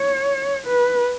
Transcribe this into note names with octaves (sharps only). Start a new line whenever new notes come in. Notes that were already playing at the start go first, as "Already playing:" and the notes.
Already playing: C#5
B4